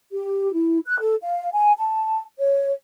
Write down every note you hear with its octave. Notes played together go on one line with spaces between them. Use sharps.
G4
E4
F#6
A4
F5
G#5
A5
C#5